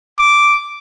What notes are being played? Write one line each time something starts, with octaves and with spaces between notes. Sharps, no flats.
D6